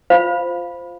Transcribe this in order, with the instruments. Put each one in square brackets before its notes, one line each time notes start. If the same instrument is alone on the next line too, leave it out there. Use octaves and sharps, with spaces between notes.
[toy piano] F4 C5 F5 B5